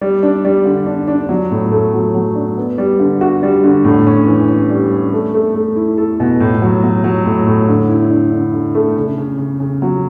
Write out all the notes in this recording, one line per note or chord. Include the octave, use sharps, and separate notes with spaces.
G3
D4
G3
D3
D4
D4
F#3
A2
A3
F#3
F#3
D4
B3
G3
D3
F#4
G3
D3
A2
C#4
E3
C#4
G3
C#4
A3
A3
A3
E4
A4
B2
A2
F#3
F#3
F#3
A2
A2
D3
E4
D3
D3
D3
A3
C#3
C#3
C#3
C#3
F#3